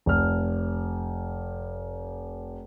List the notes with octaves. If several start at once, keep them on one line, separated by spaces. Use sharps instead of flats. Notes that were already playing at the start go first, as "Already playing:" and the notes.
F1 F6